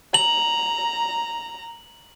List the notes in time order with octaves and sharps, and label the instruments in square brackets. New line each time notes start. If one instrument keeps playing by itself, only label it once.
[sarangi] A#5 [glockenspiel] F#7